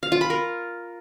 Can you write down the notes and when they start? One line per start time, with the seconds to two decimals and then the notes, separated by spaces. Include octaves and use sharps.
0.03 F5
0.12 F4
0.21 B5
0.30 A#4